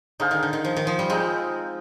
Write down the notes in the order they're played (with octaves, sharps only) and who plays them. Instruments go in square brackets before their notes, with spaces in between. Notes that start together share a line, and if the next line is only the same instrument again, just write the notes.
[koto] D3 [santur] D#4 G#4 C5 F5
[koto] D#3
D3
D#3
F3
D#3
F3
G3
[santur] F3 C4 D#4 [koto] G#3